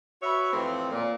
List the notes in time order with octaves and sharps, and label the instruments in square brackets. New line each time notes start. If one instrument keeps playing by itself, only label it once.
[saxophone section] F#4 B4 C#5 E5
F2 A2 E3 C4
A#2